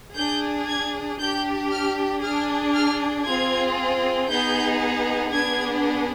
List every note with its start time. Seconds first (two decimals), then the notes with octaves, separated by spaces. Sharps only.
0.16 D4 G#4 G6
0.68 G#6
1.19 D4 G4 G6
1.72 F6
2.23 D4 G#4 F6
2.75 F6
3.26 C4 F4 G#4 G#6
4.29 B3 D#4 G#4 G6
5.32 B3 D4 G#4 G#6